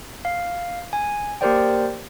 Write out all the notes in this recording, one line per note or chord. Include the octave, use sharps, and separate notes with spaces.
F5
G#5
A#3 G4 A#4 C5 D5 G5